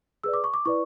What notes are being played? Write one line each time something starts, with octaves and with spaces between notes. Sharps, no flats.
G#4 B4 D5 E6
D6
C#6
D6
E4 B4 D5 C#6